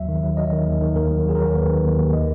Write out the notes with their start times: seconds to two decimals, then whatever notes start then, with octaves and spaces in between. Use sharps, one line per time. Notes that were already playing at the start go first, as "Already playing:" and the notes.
Already playing: D#2 F#3 E5
0.09 D#3
0.23 F#3
0.37 F#3 D#5
0.52 D#3
0.67 D#2
0.81 D#3
0.96 D#2 A#4
1.11 F#3
1.25 F#3 G#4
1.35 F#3 A#4
1.55 D#2 B4
1.70 D#3
1.84 D#2
1.98 D#2
2.13 D#5